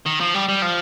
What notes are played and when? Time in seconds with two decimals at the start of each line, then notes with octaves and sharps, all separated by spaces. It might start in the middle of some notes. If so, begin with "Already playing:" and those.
0.06 D#3
0.20 F3
0.34 G3
0.49 G3
0.62 F3